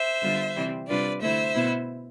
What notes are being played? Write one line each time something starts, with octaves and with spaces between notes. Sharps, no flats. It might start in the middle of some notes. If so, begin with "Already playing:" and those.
Already playing: C5 E5
D3 G3 B3 D4 F4
C3 E3 G3 C4
C3 G3 D4 F4 B4 D5
D3 A3 E4 C5 E5
B2 B3 E4